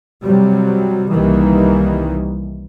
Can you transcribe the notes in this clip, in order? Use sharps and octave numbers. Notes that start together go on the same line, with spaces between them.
C3 F#3 G3
C2 D#3 E3 G3 A#3